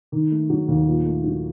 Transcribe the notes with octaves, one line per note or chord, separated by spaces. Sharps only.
D#3
A3
F#3
D#2
A#2
A3
F#3